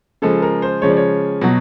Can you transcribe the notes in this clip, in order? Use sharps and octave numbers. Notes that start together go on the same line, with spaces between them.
C#3 F3 G#3 A4
A#4
C5
C#3 F3 G#3 C#5
D5
C#5
B2 F#3